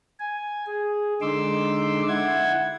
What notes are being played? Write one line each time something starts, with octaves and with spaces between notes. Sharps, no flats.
G#5
G#4
D3 G#3 D#4 C6 D6 E6
E4 F#5 G#6